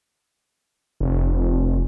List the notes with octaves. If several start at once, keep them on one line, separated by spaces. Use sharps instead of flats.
F1